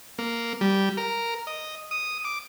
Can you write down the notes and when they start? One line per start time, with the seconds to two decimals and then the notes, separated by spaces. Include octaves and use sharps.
0.19 A#3
0.61 G3
0.97 A#4
1.47 D#5
1.91 D#6
2.25 D6